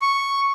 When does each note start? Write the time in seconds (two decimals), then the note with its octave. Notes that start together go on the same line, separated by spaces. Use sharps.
0.02 C#6